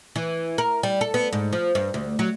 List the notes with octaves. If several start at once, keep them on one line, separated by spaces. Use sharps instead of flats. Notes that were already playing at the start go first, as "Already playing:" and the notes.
E3
A#4
G3
A4
B3
G#2
F3
G2
D2
F#3